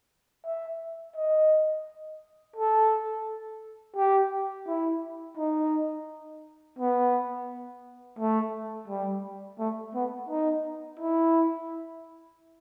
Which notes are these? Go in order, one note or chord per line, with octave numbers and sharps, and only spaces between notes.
E5
D#5
A4
G4
E4
D#4
B3
A3
G3
A3
B3
D#4
E4